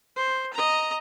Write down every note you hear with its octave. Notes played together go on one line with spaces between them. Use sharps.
C5
D#5 A#5